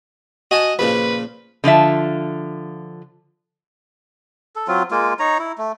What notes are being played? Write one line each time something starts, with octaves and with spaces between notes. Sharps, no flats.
F#4 D#5 G#5 A5
A#2 C#3 F3 B4
D3 F3 F4 E5
A4
F#3 C4 F4
G#3 A#3 F4
D#4 C#5 A#5
E4
A3